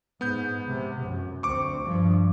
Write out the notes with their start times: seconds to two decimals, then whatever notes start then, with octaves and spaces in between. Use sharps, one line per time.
0.21 G#2 B3 G6
0.67 C3
1.02 F#2
1.43 D2 C4 C#6 D6
1.83 G2 F3